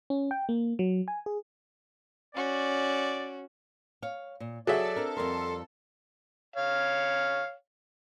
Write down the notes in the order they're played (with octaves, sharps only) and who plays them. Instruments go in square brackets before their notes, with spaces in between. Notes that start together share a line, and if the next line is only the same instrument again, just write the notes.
[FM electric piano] C#4
G5
A#3
F#3
G#5
G#4
[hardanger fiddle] C#4 F#4 [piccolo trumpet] D5
[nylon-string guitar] C#5 F5
A#2
[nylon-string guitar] F#3 [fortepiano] F#4 G#4 E5 [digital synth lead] A4 [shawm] D5
[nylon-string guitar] C4 D4 A#4
[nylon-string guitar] F2 G3 A#4 [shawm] C6
[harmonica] C#5 F5